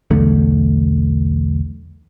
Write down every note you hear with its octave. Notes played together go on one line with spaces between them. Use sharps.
B1 E2 D3 A3